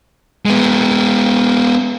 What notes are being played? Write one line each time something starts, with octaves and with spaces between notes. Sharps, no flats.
G#3 B3